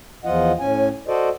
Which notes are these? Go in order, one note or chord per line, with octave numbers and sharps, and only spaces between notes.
E2 F3 F4 D#5 F#5
A2 C#4 G#5
F#4 A4 C5 D5 D#5